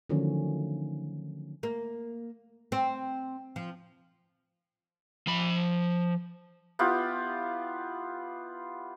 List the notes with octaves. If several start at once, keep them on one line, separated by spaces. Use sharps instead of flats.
D3 D#3 F3 F#3 A3 C#4
A#3
C4
F3
F3 B5
B3 E4 F4 G4